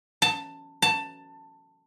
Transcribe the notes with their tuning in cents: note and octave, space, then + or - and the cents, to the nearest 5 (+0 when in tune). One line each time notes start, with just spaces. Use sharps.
A5 +15
A5 +15